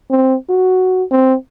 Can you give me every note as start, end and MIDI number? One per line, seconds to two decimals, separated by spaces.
0.11 0.36 60
0.50 1.04 66
1.11 1.35 60